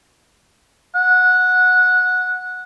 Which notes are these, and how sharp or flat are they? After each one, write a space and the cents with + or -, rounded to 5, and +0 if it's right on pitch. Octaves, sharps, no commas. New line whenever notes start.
F#5 -15